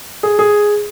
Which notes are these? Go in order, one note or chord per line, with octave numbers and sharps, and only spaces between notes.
G#4
G#4